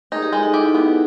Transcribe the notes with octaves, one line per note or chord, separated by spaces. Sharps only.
D#4 G#4 A#4
G4 A4
G#3 G4 A4
D#4
E4 G4
B3